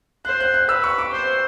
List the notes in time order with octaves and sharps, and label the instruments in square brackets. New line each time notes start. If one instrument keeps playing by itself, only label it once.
[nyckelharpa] C5 [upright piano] F#6
[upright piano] F#6
F#6
[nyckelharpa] B4 [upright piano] E6
[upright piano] C#6
D6
[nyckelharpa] C5